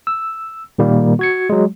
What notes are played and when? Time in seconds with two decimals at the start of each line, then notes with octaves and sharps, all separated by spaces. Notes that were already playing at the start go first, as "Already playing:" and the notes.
0.07 E6
0.78 A#2 D#3 G3 A#3
1.19 F#4 G#6 C#7
1.50 F#3 G#3